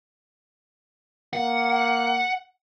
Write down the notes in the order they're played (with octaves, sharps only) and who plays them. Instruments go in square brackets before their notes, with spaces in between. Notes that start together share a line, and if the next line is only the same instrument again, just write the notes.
[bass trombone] A#3 [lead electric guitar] F#5